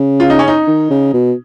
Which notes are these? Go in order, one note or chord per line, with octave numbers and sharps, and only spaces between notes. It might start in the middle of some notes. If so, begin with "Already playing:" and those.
Already playing: C#3
F4
D#4
C#4
D#4
D#3
C#3
B2